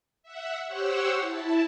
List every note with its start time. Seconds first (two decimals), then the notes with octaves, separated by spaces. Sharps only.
0.23 E5 F#5
0.65 G4 C5 C#5 F#5 C#6 E6
1.20 E4 A5